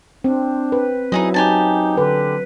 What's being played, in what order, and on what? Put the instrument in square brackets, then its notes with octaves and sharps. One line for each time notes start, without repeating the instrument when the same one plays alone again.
[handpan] C4 [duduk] D4
[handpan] B4
[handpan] F#3 [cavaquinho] D#4 G#4 D#5 [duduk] E4
[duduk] D#4 [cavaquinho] G4 G#5 A5
[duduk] D3 [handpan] B4